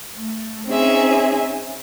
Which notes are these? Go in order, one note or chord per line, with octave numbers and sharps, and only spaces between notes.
A3
C4 C#4 D#4 G#4 E5 G#5